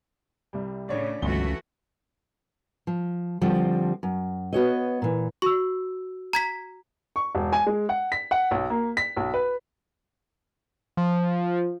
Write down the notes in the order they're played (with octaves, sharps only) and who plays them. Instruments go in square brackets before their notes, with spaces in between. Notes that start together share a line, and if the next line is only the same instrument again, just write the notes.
[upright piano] C2 C3 G3
[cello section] A2 C#3 [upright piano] D4 C#5 D5
[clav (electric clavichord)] G1 [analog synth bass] C#2 [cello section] E3 A3 F#4 [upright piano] G7
[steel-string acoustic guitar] F3
D3 F3 G3 C4
F#2
B3 F#4 C#5 D#5
A#2 E3
[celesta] F#4 E6 [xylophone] C#6
[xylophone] A#5 G#6 B6
[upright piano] C#6
E1
G#5
G#3
F#5
B6
F#5
B1
A#3
B6
B1
B4
[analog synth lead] F3